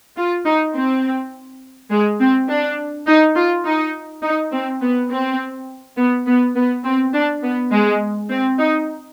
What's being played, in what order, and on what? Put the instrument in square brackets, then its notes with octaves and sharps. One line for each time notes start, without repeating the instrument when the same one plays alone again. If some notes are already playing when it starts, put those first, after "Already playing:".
[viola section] F4
D#4
C4
G#3
C4
D4
D#4
F4
D#4
D#4
C4
B3
C4
B3
B3
B3
C4
D4
B3
G#3
C4
D#4